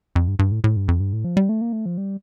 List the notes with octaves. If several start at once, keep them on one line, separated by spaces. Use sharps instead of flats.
F2
G2
G2
A2
A2
G2
F2
G2
A2
F3
G3
A3
A#3
A3
F3
G3